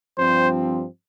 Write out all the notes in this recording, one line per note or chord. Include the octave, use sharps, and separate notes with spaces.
G2 F3 C4 C5